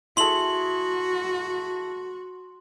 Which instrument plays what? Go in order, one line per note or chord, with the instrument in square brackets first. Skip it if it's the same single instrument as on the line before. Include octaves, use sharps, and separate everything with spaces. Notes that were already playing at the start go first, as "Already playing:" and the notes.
[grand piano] E4 G#4 A4 [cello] F#4 [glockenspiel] C6 F#7